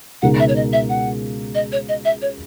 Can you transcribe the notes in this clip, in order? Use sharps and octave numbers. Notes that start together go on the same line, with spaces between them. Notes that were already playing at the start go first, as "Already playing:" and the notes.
C#2 B2 G#3 D#4 A#4 F#5
E5
C#5
D#5
E5
F#5
D#5
C#5
D#5
E5
C#5